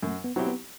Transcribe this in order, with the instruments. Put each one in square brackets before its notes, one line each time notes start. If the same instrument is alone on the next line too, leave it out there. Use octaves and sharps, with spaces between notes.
[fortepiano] F#2 [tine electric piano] A3
[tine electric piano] B3
[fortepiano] F#3 C4 E4 G4
[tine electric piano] B3